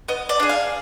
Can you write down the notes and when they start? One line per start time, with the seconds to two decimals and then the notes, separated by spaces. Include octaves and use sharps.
0.08 B3 D#5
0.29 D5
0.40 D4 G#4
0.49 F5